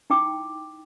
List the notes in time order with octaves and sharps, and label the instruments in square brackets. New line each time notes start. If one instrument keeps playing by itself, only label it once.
[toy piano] D#4 E4 G5 D6